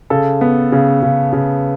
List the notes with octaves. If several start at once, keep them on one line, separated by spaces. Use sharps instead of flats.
C#3 A4
B3
C#3
C#3
C#3